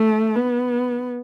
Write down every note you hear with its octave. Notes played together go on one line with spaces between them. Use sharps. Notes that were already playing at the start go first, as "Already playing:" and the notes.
Already playing: A3
B3